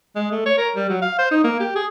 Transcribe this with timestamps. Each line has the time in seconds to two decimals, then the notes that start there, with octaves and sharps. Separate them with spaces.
0.16 G#3
0.32 A3
0.46 C#5
0.58 A#4
0.76 G3
0.90 F#3
1.02 F5
1.19 C5
1.31 D#4
1.44 A#3
1.60 G4
1.76 G#4